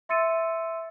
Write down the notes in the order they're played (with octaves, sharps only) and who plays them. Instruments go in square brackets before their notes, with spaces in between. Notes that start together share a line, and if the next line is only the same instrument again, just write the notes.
[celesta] E5 C6 E6 A6 C#7 D#7